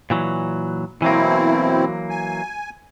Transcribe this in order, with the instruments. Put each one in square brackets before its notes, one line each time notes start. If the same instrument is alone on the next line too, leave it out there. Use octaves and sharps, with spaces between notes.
[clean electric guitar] A#2 E3 F#3
[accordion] B2 C4 E4 [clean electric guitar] E3 F#3 A#3
[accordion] G#5